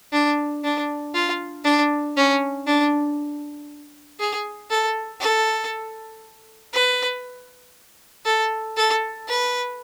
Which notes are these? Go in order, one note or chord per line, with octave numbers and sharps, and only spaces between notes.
D4
D4
F4
D4
C#4
D4
G#4
A4
A4
B4
A4
A4
B4